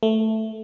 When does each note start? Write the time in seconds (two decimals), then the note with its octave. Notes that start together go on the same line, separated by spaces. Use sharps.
0.03 A3